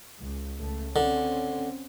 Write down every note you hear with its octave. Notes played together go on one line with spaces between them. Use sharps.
C#2
C#2 A3
D3 C4 C#4